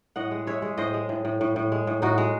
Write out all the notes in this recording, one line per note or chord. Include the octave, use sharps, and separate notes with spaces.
A2 D#5 F#5
G#3
G#3 C#5 E5
G#3
A2 C5 D#5
G#3
A2
A2
A2
A2
G#3
A2
A2 D#4 F#4
G#3